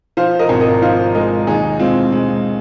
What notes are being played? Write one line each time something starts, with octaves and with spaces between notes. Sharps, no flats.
F3 C5 F5
A#4 D#5
G#1
A#4 D#5
F3 C5 F5
G#3 A#4 D#5
D#2 D#4 G#4
G#3 C4 F4
G#3